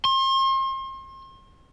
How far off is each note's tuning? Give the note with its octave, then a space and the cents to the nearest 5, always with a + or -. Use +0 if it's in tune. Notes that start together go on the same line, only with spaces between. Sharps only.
C6 +40